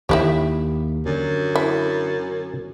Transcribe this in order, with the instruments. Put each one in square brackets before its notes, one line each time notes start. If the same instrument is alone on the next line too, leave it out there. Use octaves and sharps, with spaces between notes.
[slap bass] D#2 D#3 [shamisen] D#4 E4 C#5 [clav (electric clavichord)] G4 E5
[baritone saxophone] F#2 [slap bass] D3
[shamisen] E4